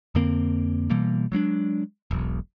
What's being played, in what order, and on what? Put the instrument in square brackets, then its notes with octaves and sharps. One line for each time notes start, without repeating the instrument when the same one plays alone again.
[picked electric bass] F2 D3 A#3 C4
B2 E3 G3 A#3
F#3 G#3 C4 D4
E1 B1